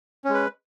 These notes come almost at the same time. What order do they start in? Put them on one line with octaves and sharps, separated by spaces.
C#4 G#3 B4